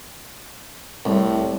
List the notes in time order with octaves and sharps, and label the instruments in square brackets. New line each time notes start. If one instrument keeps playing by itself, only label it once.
[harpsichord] C2 [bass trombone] A2